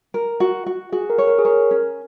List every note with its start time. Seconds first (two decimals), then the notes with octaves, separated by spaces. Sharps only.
0.14 A#4
0.40 F#4
0.66 F#4
0.92 F#4 G#4
1.10 A#4
1.18 C#5
1.27 A#4
1.39 G#4
1.45 A#4 C#5
1.71 C#4